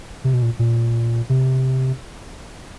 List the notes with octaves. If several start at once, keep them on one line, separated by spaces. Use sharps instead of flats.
C3
B2
A#2
A#2
C3